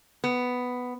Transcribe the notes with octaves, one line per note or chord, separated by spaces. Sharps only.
B3